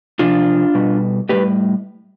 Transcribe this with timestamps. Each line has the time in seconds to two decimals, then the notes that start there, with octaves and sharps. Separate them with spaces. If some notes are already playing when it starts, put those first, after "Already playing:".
0.19 C3 F3 D4 F4
0.75 B2 G3
1.29 A2 E3 G3 G4 B4